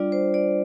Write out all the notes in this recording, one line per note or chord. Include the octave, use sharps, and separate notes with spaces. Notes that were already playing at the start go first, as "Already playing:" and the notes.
Already playing: G3 D4 F4 D5
C5
D5